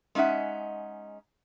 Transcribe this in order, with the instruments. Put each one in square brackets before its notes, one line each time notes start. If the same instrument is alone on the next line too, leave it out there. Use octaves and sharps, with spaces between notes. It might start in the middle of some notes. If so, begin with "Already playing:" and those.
[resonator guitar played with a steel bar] G#3 C#4 D#4 E5 F#5